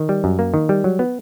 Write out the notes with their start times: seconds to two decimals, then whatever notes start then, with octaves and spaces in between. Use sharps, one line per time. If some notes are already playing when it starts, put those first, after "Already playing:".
Already playing: D#3
0.09 G3
0.24 F#2
0.39 A#3
0.54 D#3
0.69 G3
0.84 F#3
0.99 B3